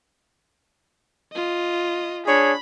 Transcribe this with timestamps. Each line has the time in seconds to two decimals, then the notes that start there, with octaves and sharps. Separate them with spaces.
1.33 F4 D#5
2.26 D4 G#4 C#5 B5